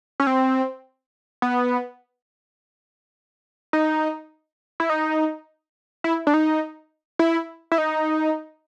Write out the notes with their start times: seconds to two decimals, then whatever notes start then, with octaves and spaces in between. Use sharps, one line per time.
0.20 C#4
0.27 C4
1.42 B3
3.73 D#4
4.80 E4
4.90 D#4
6.04 E4
6.27 D4
6.34 D#4
7.19 E4
7.72 E4
7.78 D#4